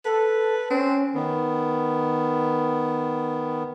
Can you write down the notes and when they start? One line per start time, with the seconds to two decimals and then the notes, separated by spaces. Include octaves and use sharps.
0.05 A4 B4
0.70 C4 C#4
1.15 D#3 B3